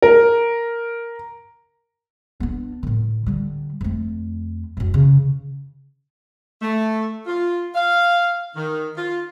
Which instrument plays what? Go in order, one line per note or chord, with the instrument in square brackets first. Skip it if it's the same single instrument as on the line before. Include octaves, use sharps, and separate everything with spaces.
[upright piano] A#4
[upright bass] B3 D4
A2 D#3
D3 G3
F2 A3
E1 F#2
C#3 E3
[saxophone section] A3
F4
F5
D#3
F4